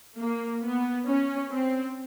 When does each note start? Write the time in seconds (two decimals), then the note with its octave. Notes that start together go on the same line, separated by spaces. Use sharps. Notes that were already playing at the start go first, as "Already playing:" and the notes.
0.17 A#3
0.62 B3
1.06 C#4
1.51 C4